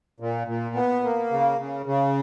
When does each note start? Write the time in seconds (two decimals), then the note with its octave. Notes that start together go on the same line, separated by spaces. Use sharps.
0.20 A#2
0.47 A#2
0.75 B3
1.03 A#3
1.31 C#3
1.58 C#3
1.86 C#3